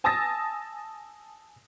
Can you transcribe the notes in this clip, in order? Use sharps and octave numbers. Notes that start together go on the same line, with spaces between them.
G#5 A5 D#6 E6 A6 A#6